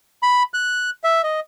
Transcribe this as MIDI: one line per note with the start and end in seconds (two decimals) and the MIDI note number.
0.23 0.43 83
0.54 0.90 90
1.04 1.22 76
1.23 1.40 75